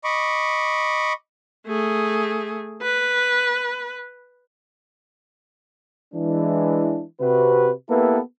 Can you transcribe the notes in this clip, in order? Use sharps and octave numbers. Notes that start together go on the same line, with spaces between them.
D#5 B5 C#6 D6
A3 G#4
B4
E3 G#3 D4
C3 F#4 B4
A#3 B3 E4 G4 A4 B4